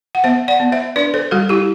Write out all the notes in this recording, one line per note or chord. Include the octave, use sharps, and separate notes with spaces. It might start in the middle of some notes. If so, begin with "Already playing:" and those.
F#5
B3 C5 E5
D5 F#5
B3
C5 E5
D4 B4 D5
A4 C5
G3 F#4 A4
E4 G4